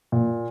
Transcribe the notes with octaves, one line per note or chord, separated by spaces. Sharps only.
A#2